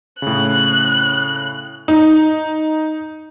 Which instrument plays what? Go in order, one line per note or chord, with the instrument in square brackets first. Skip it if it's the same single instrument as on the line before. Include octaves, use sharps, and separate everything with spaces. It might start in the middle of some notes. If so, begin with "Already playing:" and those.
[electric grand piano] A2 C#3 [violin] F#6
[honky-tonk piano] D#4